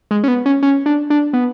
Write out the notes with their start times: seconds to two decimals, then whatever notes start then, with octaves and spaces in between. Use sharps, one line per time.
0.11 G#3
0.24 C#4
0.28 B3
0.46 C#4
0.63 C#4
0.86 D4
1.10 D4
1.33 B3